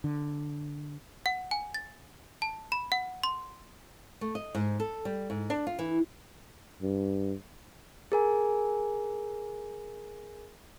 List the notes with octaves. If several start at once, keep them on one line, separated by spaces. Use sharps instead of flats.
D3
F#5
G#5
A6
A5
B5
F#5
C6
A3
D#5
G#2
A4
G3
G#2
D4
F4
E3
G2
G#4 A#4 G#5